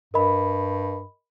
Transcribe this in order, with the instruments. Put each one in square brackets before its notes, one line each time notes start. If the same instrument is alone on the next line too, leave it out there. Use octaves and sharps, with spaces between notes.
[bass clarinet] G2 [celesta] A#4 D#5 B5